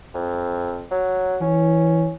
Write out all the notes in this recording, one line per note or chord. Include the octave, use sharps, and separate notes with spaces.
F2
F#3
E3 C#4